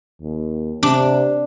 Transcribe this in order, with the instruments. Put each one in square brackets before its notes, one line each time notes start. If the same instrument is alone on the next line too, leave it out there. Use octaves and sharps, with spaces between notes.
[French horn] D#2
[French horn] C3 [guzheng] D4